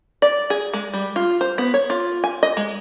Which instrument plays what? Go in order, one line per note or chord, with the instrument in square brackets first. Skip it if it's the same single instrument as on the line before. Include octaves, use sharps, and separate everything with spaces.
[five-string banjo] D5
G#4
G#3
G3
F4
C5
B3
C#5
F4
G#5
D#5
G#3